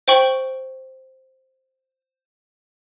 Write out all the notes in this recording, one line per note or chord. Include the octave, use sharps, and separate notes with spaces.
C5 G5 C#6 F#7